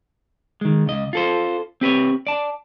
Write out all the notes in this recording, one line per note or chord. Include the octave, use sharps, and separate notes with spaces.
D#3 G#3
C#2 D#5
F4 A4 C5
C4 G4 B4 C#5
D5 A5